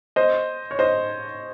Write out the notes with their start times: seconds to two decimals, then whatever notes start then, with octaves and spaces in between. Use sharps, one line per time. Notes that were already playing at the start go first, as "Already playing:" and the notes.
0.16 C5 D#5
0.71 C#5
0.79 C5 D#5